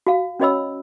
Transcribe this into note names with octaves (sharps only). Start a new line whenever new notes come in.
F#4 F5
C#4 F#4 C#5 D#5 B5 E6